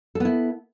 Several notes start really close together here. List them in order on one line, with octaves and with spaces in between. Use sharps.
A4 B3 E4